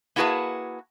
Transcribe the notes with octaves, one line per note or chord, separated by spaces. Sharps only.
A#3 E4 F#4 G#4 B4 A5